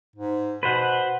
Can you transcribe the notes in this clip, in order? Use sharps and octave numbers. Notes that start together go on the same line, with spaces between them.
G#2
B2 B4 C5 F#5